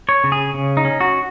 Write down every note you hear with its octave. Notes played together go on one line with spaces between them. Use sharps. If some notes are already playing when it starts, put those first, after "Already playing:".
C#5
C#3
G#4
C#3
D#4
C#4
F#4